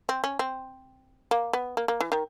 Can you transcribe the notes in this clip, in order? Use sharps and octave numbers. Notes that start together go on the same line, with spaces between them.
C4
C#4
C4
A#3
B3
A#3
A#3
E3
D#3